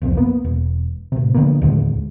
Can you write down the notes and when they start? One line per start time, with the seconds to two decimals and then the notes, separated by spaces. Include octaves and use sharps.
0.02 F#1 C2 F2 C4
0.17 A#3 B3
0.44 E1
1.12 A2 C3
1.34 D3 F3 A#3 B3
1.62 D#2 A2 D3 G#3